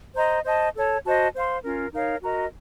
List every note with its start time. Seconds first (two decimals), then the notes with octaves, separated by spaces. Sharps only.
0.15 C5 D#5 A#5
0.45 C5 D#5 A5
0.74 A4 C#5 A5
1.05 F#4 C5 D#5 A5
1.33 C5 F5 C6
1.64 C#4 F4 A#4
1.92 D#4 A#4 C#5 F5
2.22 F#4 A#4 D#5 A#5